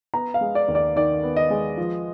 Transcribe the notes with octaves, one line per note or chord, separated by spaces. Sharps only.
B3 A#5
F5
G#3
D5
D#2
D5
D#3 D5
B3
D#5
G#3
F3